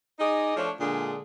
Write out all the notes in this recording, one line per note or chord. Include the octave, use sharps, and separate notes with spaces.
D#4 G#4 D5 D#5
F3 A3 D4 C#5
A#2 D3 G#3 D4 G#4